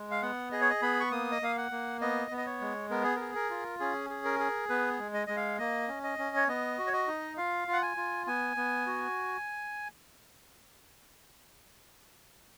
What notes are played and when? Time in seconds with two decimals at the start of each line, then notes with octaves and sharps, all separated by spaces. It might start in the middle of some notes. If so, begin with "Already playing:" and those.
Already playing: G#3
0.11 F5
0.22 B3 F#5
0.52 G#4 D#5
0.61 C#5
0.70 D#5
0.82 B3 B5
1.00 C#6
1.11 A#3 D#6
1.32 D#5
1.42 A#3 F5
1.57 F#5
1.71 A#3
2.01 B3 D#5
2.31 B3
2.37 D#5
2.46 C#5
2.61 G#3
2.90 B3 A#4
3.03 G#4
3.16 G#4 A#4
3.35 A#4
3.50 F4
3.80 C#4 G#4
4.10 G#4
4.25 A#4
4.39 G#4
4.69 B3 B4
4.99 G#3
5.14 D#5
5.27 G#3 D#5
5.37 F5
5.59 A#3 D#5
5.88 C#4
6.04 D#5
6.19 C#4
6.36 C#5
6.48 B3 D#5
6.78 F#4
6.87 C#5
6.93 D#5
7.07 D#4
7.37 F4 F5
7.68 F4 F#5
7.82 G#5
7.97 F4
8.27 B3 G#5
8.57 B3
8.87 F#4